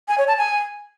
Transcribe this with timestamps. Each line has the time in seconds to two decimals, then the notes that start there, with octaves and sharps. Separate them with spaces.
0.08 G#5
0.18 C#5
0.28 A5
0.37 G#5